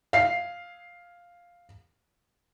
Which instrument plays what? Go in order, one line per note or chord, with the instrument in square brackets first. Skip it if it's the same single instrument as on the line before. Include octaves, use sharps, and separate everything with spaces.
[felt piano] F5 C7